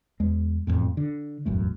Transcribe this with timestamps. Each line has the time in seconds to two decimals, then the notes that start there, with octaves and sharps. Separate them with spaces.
0.20 E2 G#3
0.67 E1 B1 F2 A2
0.97 D3
1.46 E1 A1 F#2 A3